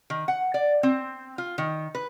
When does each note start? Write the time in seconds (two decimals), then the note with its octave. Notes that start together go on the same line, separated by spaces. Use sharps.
0.10 D#3
0.28 F#5
0.54 D5
0.83 C4
1.38 F4
1.58 D#3
1.95 B4